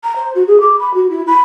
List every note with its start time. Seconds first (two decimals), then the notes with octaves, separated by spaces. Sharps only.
0.04 A#5
0.16 C5
0.35 F#4
0.47 G#4
0.61 D6
0.79 B5
0.94 F#4
1.10 E4
1.27 B5